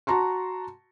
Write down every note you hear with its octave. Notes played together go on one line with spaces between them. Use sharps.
F#4 A5 A#5 C6 C#6